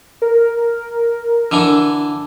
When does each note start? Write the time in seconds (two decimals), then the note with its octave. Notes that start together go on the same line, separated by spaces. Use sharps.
0.22 A#4
1.51 D3 E3 D4